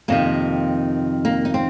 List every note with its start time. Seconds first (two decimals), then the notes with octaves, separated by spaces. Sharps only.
0.08 F2 C3 D#3 A#3
1.25 A#3
1.45 D#4
1.54 C4